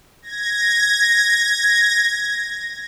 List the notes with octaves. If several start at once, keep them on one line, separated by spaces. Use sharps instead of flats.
G#6 A#6